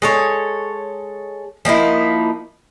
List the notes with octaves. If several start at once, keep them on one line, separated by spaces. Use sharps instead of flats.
G#3 A4 C#5
F3 A#3 D#4 E4